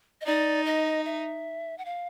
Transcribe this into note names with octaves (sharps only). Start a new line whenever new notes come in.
D#5
D#4 D5
D#5
E5
F#5
F5